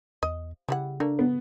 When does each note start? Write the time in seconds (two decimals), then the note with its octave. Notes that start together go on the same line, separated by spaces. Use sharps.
0.23 E2 D#5
0.69 C#3 G3 E4 F#5
1.00 A3 A#3 D4
1.19 B3